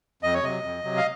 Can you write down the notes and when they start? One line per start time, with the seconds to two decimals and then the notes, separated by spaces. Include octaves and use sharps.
0.22 F2 D#5
0.34 C#5
0.43 C3 F#3 D#5
0.63 F2
0.84 C3 F#3
0.97 F5